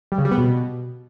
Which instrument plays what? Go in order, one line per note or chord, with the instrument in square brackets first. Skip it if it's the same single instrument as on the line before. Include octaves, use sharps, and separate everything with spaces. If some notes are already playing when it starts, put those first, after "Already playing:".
[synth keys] G3
C#3
G3
B3
B2